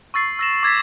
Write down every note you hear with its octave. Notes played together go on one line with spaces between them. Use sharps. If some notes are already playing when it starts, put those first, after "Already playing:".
C#6 E6 A6 C7
E6 A#6 E7
D6 G#6 A6 B6